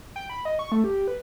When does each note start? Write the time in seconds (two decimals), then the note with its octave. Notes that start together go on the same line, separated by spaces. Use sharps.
0.16 G5
0.30 B5
0.45 D#5
0.59 C#6
0.72 A3
0.84 G4
1.08 B4